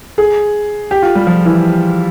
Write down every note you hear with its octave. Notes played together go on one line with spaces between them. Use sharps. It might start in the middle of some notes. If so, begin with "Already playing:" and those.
G#4
G4
F4
G3
F3
E3